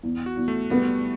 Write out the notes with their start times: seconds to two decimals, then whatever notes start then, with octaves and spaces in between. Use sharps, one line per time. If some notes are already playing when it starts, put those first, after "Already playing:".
0.03 E2
0.26 F#4
0.37 E2
0.48 A3
0.70 G3 B3